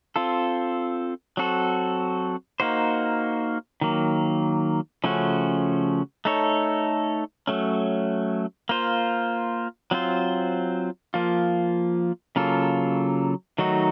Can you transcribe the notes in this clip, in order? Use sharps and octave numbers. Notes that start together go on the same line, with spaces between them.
C4 F4 A4
F#3 C4 F#4 A4
A#3 D#4 F#4 C5
D#3 F#3 A#3
C#3 F3 A3 C#4 F#4
A3 D#4 A4 C#5
F#3 A3 C#4
A#3 F4 C5
F#3 C4 F4 C5
F3 A#3 F4
C#3 F#3 A#3 F4 A4
D#3 F#3 A3 D#4 F#4